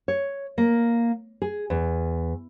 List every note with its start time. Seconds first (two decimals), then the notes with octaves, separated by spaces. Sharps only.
0.08 C#5
0.58 A#3
1.42 G#4
1.70 E2